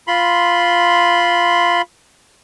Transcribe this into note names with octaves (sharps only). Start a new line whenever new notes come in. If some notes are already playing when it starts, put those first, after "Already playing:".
F4 B5 C6